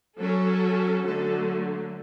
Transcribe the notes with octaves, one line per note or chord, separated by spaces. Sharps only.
F#3 C#4 A4
D3 F#3 A3 A4